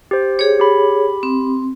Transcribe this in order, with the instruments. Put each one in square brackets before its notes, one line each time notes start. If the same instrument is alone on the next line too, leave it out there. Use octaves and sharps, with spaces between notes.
[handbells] G4 C5
[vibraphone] G#4 C#5
[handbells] G4 B5
[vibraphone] C4